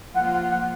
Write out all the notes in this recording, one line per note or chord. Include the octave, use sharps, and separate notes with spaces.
F3 A#3 F4 F#5
F#5
F#5